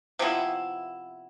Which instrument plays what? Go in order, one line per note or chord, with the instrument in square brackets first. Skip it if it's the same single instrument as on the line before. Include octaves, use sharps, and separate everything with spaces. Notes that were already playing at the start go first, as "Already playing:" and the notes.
[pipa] C3 F3 B3 E4